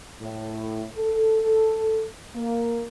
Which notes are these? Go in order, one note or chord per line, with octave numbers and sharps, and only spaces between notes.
A2
A4
A#3